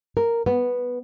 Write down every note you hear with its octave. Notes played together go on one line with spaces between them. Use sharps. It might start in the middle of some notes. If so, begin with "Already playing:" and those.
A#4
B3